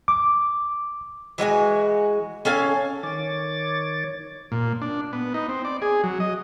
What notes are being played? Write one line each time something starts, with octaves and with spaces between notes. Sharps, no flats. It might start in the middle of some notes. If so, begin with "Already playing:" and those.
D6
E3 G#3 F#4 G#5
C#4 A4 F5 G#5
D#3 C#5 D6 A6
A#2
D4
B3
D#4
C4
D5
G#4
F#3
D#5